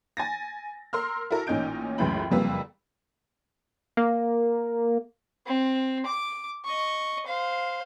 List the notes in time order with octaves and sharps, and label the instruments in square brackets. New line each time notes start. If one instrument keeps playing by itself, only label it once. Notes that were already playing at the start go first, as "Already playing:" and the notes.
[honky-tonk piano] G#5 A6 A#6
A#4 C6 E6 F6
E4 F#4 A4 A#4
A1 A#2 C#4 D#4 G6 D7
C#2 F#2 A2 E3 G5 B5
F#1 F2 G3 A#3 B4 E6
[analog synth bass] A#3
[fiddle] C4
D6
D#5 C#6
C5 F5